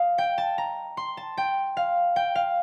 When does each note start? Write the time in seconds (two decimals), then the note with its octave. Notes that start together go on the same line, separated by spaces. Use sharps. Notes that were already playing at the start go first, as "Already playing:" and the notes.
Already playing: D#5 F5
0.18 G5
0.38 A5
0.58 A#5
0.97 C6
1.17 A5
1.37 G5
1.77 F5
2.16 G5
2.35 F5